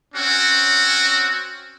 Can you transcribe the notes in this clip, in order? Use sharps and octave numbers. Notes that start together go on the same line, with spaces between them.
C4 C#4 F#4